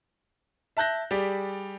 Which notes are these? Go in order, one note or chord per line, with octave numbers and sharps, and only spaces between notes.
E5 A5 F#6 G6 A#6
G3 G4 G#4 D5